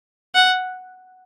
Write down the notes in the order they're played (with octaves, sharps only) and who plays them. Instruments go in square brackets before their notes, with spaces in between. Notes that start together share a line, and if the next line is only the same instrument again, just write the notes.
[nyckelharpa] F#5